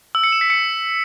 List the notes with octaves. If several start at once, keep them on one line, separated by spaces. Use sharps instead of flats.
E6
C#7
E7
B6
C#7